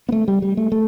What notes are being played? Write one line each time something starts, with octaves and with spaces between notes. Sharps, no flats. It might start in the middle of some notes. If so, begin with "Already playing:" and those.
B3
A3
G3
G3
A3
A3